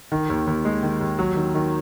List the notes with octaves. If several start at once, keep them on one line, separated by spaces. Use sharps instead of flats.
D#3
D#2
D#2
G#3
D#3
D#2
F#3
D#3
D#3